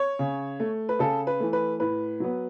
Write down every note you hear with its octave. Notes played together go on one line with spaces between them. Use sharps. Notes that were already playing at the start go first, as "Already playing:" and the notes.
Already playing: C#5
C#3
A3
B4
C#3 A4
B4
E3 A3
B4
A2 B4
F#3 B3